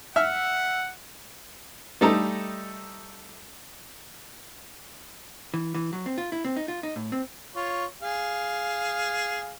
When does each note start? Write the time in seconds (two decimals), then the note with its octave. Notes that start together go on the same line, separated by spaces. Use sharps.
0.16 E5 F#5 F6
2.01 G3 A3 D#4 A4 D#5 A#5
5.54 E3
5.74 E3
5.93 F#3
6.06 C4
6.18 F4
6.32 E4
6.44 C4
6.56 D#4
6.68 F4
6.83 D#4
6.96 A2
7.12 C4
7.56 F4 C#5
8.02 G#4 F5